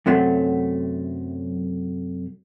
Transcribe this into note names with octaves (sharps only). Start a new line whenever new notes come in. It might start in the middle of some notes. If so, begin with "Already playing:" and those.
F#2 C3 F#3 A3